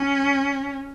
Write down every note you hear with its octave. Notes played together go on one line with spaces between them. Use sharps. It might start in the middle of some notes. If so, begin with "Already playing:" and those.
Already playing: C#4